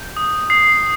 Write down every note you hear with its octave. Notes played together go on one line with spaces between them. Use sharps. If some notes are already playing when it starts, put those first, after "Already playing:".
Already playing: G6
D#6
D#6 C7